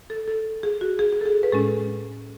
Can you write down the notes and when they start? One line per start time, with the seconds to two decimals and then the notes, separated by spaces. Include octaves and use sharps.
0.10 A4
0.28 A4
0.63 G#4
0.81 F#4
0.99 G#4
1.13 G#4
1.21 A4
1.26 G#4
1.43 B4
1.52 A2 G#3 C#4 A4